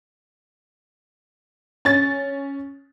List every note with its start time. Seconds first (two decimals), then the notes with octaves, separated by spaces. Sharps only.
1.85 C#4 A6